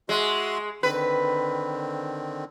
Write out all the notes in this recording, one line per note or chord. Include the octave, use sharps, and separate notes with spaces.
G#3 F#4 E5 C6
D3 D#3 C4 B4